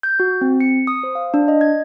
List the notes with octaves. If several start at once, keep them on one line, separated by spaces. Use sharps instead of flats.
G6
F#4
C4
C#7
D#6
C5
F5
D4
D#5
G#6